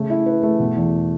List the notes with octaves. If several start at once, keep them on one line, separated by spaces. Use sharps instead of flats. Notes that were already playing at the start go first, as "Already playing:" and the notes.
Already playing: C#3 A3
E4
B4
A3
B2
E2